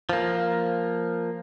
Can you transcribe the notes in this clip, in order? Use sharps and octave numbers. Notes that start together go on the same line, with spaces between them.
F3 A#3